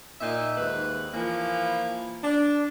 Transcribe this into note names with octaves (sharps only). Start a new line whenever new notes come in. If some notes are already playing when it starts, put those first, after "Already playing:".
A#2 D#4 E5
D#2 G#2 B4
E3 F3 A#3
D4